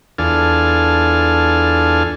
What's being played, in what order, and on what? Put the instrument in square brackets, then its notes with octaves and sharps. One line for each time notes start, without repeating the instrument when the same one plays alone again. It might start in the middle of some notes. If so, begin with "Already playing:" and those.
[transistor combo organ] E2 D4 F4 A4 G#5 F6